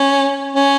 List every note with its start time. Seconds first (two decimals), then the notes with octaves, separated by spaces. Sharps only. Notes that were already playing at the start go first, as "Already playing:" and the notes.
Already playing: C#4
0.55 C#4